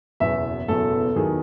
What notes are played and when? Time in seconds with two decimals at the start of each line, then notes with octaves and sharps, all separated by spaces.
0.20 F#1 E2 B2 F#3 E5
0.68 F#1 E2 B2 F#3 A4
1.16 E2 D#3 F#3 G#4